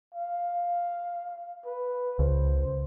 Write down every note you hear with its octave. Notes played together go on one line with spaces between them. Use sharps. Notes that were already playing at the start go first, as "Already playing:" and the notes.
F5
B4
C#2 C5